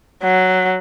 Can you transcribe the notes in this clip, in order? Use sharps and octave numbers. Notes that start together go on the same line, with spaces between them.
F#3